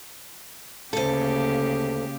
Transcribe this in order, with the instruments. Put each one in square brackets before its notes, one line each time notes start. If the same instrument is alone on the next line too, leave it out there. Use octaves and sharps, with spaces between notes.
[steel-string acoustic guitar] D2 A4 [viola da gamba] C#3 A#3 G4